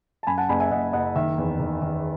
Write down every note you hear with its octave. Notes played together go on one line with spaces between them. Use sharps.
A5
F#2 G#5 B5
F#5 A5
F#1 G#5 B5
E5 G#5
F#1 D#5 F#5
F#1 D#5 F#5
D#3 E5
E2
D#3
D#3